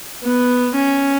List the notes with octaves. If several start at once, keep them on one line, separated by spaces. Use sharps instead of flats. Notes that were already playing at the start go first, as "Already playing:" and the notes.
B3
C#4